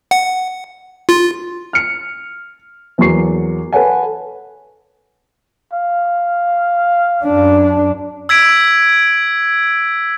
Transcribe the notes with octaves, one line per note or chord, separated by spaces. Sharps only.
F#5
F4
F6 C#7
E2 F#3 A#3 C#6 C7
A4 B4 C#5 F#5 G#5
F5
F#2 D4
E6 G#6 B6 D7